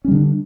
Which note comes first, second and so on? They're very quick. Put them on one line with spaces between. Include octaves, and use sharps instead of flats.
C#4 G3 D3 D4